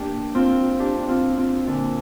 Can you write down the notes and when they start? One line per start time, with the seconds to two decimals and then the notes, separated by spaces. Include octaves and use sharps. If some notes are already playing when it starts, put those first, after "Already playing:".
Already playing: A#3 D4 G4
0.35 C4 F4
0.79 D4 G4
0.99 D4
1.08 C4 F4
1.37 C4 F4
1.67 A#2 D3